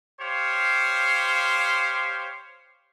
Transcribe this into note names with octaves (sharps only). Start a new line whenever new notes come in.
G4 C5 C#5 F5